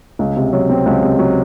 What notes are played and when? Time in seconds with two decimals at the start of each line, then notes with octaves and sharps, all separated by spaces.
0.19 C#2
0.37 C3
0.53 F#3
0.70 C4
0.86 C#2
1.03 C3
1.19 F#3